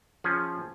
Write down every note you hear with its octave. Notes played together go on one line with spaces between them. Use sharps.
F3 C#4 G#4